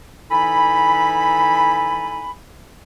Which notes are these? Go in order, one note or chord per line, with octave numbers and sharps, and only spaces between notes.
E3 D#4 E4 A4 G#5 B5